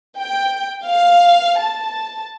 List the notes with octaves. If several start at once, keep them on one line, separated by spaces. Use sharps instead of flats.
G5
F5
A5